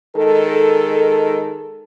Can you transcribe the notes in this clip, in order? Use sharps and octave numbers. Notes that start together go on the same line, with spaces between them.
D#3 G#3 A4